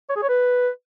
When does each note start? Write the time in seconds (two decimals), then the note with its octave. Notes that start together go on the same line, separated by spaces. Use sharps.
0.10 C#5
0.16 G#4
0.23 C#5
0.29 B4